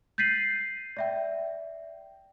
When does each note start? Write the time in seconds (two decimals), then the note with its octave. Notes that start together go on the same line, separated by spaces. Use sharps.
0.18 G6 A6 B6 C7 D#7 F#7
0.97 D5 E5 G5